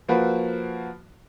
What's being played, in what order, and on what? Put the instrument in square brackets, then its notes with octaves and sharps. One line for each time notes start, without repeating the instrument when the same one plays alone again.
[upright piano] F3 A#3 F#4 B4